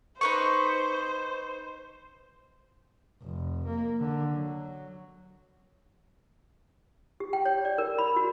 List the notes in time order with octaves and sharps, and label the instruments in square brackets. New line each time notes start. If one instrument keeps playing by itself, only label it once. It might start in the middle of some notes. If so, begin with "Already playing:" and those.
[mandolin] D#4 B4 C#6 [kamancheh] C5
[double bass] F1
A#3
D3
F#3
[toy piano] G4
G5
C#5
D5
A#4
B5
F#4